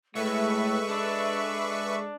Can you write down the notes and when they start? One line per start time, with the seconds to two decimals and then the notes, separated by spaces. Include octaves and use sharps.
0.15 A2 G#3 A4 B4 E5 C#6
0.88 D4